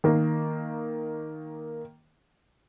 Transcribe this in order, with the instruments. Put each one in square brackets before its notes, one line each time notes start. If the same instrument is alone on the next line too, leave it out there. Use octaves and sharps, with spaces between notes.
[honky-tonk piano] D#3 A#3